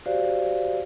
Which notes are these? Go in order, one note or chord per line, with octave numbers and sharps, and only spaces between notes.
F#4 G4 C5 D5 F5